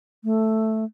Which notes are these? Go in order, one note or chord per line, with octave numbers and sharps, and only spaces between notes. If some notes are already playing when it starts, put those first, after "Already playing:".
A3